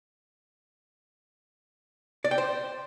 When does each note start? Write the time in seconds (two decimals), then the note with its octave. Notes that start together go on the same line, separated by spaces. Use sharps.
2.24 D5
2.31 G5
2.38 C5